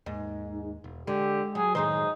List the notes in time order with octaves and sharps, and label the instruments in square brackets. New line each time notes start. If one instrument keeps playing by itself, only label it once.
[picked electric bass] D#2 [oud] G#2
[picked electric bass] E1
[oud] D3 [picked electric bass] G#3 [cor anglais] G4
[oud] F#3 [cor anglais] G#4
[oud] F#2 G#3 C5 [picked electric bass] A2 D#3 [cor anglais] D#4